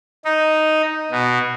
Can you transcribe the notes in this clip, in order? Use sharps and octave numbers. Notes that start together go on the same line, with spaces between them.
D#4
B2